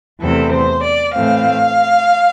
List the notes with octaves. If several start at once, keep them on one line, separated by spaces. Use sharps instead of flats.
E2 C3 E3 A3 C4 A4
C5
D5
A2 E3 A3 C4 F5